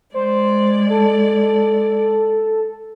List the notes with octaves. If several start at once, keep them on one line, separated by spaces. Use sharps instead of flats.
G#3 C5 D5
A4